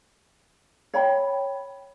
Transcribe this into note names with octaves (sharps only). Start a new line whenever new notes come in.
C#5 G5 B5